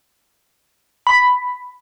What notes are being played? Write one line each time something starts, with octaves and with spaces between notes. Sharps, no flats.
B5